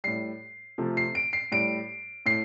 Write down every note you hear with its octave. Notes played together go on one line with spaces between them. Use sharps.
A2 G3 C7
C3 F3 A3
C7
D7
C7
A2 G3 D7
A2 C7